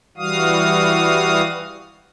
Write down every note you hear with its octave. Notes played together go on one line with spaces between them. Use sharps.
E3 G3 F#4 F5 D#6